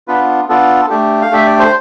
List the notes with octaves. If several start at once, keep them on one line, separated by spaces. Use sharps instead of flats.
B3 D4 F4 B4
B3 D4 F4 A4
A3 D4 G4
F5
A3 D4 G4 E5
D5
C5